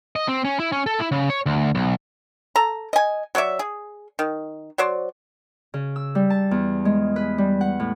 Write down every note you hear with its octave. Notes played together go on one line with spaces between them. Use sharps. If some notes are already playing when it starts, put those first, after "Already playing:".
D#5
C4
C#4
E4
C#4
A4
E4
C#3
C#5
D2
B1
A4 A#5
D#5 G#5
F#3 C#5 D5 E5
G#4
D#3
F#3 F#4 C5 D5
C#3
E6
G3
A5
E2
G#3
B4
G3
F#5
A2